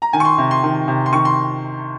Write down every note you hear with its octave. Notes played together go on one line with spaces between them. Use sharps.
A#5
D#3 G#5
C#6
C6
C3
C6
D#3
C3
C6
D#3 C#6
C6